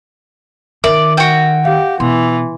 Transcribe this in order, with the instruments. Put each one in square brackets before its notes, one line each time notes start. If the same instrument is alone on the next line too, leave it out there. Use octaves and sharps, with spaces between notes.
[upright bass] D#3 [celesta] A#4 E5 [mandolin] D5
[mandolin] F#4 G5
[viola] G4 [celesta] F5
[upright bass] B2 [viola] E3 [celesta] C6